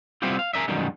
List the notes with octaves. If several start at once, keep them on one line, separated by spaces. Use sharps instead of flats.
G3 B3 C4 E4 F4 G4
F5
G#4 A#4 D#5 E5
F#2 B2 D3 D#3 G3 G#3